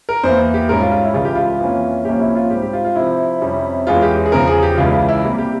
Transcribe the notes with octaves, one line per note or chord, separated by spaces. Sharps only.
A#4
E2 E3 A#3 C5
G4
G#2 G3 C#4 A#4
F4
F4
E4
C#2 C#3 E3 G3 F4
G4
F4
F2 E3 A#3 C#4
C2 A#2 F3 A#3 C#4 G4
E4
F4
G#2 G3 C4 G4
G4
F4
F4
C3 F3 C4 E4
F2 C3 G3 C#4
E2 E3 G#3 C#4 F4
G4
G#4
E2 C#3 F3 A#4
G#4
G4
C#2 C#3 E3 F4
F4
E4
C3 G3 A#3
G4